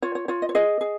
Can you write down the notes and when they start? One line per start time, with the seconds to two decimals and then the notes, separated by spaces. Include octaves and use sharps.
0.02 F4 C#5
0.15 C#5
0.28 F4 C#5
0.42 D#5
0.49 C#5
0.55 G#4 D#5
0.81 G#4